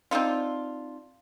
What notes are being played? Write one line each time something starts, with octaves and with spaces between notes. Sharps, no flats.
C4 D4 D#4 F4